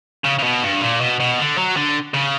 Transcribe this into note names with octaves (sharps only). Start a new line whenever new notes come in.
C#3
C#3
B2
G2
A#2
B2
B2
D3
F#3
D3
C#3